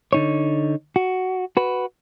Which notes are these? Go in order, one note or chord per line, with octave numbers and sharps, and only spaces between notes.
D3 D#4 C#5
F#4
F#4 B4